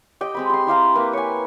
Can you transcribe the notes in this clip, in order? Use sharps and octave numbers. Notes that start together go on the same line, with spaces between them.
G4 D#5 G5
G#3 C4 B5
G4 C6
E4 G4 F5 A#5
A#3 E4 B4
C#5 G#5